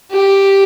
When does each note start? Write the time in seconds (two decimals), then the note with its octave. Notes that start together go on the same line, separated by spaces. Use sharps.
0.12 G4